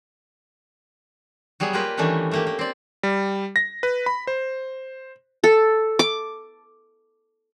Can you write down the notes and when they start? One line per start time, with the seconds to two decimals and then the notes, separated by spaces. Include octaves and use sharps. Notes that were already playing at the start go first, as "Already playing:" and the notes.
1.60 F#3 G3 B3 G#4
1.73 A#3 F4 G4 A#4 B4
1.97 D#3 E3 G3 A3 C#4 D4
2.31 A3 A#3 G4
2.47 A#3
2.59 C4 D5
3.03 G3
3.56 A#6
3.83 B4
4.06 B5
4.27 C5
5.44 A4
5.99 D6